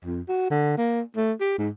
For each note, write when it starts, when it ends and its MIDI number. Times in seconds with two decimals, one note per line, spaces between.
0.05 0.21 41
0.29 0.48 66
0.50 0.77 50
0.77 1.01 58
1.16 1.33 57
1.40 1.56 67
1.58 1.69 44